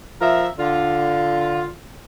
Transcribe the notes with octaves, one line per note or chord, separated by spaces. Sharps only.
F3 A#4 E5
D3 F4